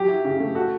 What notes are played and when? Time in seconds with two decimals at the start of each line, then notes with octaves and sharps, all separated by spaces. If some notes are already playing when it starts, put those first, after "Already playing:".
Already playing: F#3 G4
0.08 E4
0.25 C#3
0.40 A3
0.55 F#4 A4